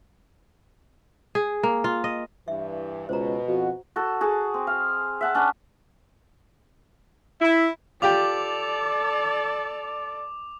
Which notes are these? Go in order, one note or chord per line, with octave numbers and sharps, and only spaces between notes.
G#4
A#3
F4
D#5
G2 E3 E5
C#2 B2 C5 A#5
F2 F#4
F#4 A4
F#4 G#4 A5
C4
F5
E5 F#5 A5
C#4 D4 F#5
E4
F4 G4 A4 D5 G5 D6 F7